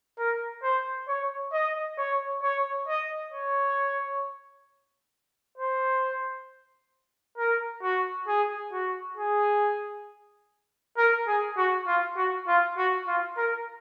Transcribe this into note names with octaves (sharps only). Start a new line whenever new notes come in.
A#4
C5
C#5
D#5
C#5
C#5
D#5
C#5
C5
A#4
F#4
G#4
F#4
G#4
A#4
G#4
F#4
F4
F#4
F4
F#4
F4
A#4